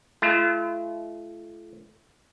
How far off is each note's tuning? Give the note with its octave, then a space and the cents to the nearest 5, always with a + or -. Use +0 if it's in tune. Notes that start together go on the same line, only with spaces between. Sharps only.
A3 -35 F4 -40